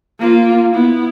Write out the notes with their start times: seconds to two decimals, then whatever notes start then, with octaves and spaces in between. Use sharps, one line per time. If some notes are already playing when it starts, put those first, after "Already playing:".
0.19 A#3 F4
0.73 B3 E4